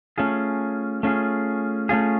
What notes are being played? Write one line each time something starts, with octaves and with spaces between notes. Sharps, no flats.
A3 C#4 F4 G#4
A3 C#4 F4 G#4
A3 C#4 F4 G#4